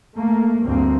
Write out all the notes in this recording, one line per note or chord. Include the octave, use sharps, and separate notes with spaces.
A3 A#3
D2 G2 A#3 C4